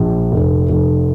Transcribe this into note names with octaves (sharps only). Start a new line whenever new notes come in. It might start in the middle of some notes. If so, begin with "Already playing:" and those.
Already playing: A#1
F1
F1